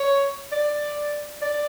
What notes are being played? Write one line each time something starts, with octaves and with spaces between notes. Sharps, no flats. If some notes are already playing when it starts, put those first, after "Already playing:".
Already playing: C#5
D5
D5